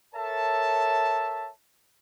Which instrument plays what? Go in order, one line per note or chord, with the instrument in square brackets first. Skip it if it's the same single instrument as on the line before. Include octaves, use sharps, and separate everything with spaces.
[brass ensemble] A4 A#4 C#5 E5 A5